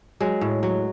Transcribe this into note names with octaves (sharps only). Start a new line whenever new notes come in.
F#3 G#3
A2
F#3